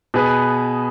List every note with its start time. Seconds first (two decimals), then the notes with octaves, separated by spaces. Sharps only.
0.14 B2 B3 G#4 B4